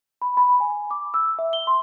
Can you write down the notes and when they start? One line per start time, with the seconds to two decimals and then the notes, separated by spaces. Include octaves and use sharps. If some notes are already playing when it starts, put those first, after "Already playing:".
0.22 B5
0.37 B5
0.60 G#5
0.91 D6
1.14 E6
1.39 E5
1.53 G7
1.67 C6